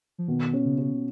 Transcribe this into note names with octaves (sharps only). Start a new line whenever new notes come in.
F3
B2 D#3
C#4
C#3
C#4